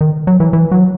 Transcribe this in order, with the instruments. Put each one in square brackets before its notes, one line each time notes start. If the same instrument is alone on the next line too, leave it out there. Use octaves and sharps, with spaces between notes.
[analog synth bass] D#3
F#3
E3
E3
F#3